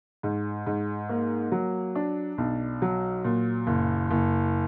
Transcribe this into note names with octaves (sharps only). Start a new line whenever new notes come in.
G#2
G#2
A#3
F#3
D4
B1
F#3
A#2
F#1
F#1